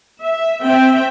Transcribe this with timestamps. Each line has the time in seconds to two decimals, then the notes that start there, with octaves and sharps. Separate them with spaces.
0.18 E5
0.62 C4 E5 G5